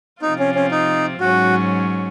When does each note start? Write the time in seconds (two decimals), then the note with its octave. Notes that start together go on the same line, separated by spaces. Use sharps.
0.22 C3 F3 C4 D#4 F4
0.39 C#4
0.55 C#4
0.71 D#4
1.20 G#2 F#3 C#4 F#4